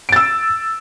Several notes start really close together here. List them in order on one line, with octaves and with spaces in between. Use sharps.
D7 A6 E6